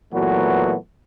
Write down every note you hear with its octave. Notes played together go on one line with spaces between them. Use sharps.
A#2 E3 F#3 A3 B3 F#4